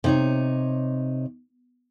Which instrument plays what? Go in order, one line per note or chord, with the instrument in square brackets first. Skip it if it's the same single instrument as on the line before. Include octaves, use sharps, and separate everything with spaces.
[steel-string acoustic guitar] C3 D#4 C#5